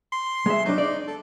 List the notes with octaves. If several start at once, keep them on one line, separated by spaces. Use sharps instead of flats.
C6
G#3 E5
F#3 D4 D#4
D5
A4